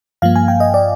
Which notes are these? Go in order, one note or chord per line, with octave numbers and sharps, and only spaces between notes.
G2 F3 A#3 F5
G#5
G5
D#5
D5